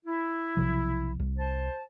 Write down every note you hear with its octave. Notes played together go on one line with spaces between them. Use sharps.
E4
B1 C3 F3
C2
C5 A5